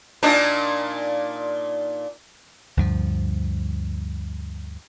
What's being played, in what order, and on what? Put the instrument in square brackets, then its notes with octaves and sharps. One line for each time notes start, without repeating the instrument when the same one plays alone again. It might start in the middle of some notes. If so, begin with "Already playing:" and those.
[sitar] A#2 D4 D#4
[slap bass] D2 G2 F3